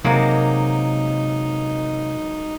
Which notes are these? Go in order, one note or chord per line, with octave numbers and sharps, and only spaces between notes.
C3 F#3 G#3 A#3 D#4